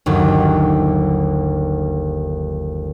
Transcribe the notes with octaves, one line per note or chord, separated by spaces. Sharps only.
G1 D#2 F#3